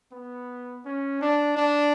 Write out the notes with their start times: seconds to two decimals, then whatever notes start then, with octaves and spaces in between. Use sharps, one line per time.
0.12 B3
0.85 C#4
1.21 D4
1.57 D4